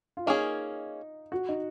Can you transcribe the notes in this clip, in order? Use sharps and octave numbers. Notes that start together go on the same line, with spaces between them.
F4
A#3 C#4 D#4 G#4
F#4
D#4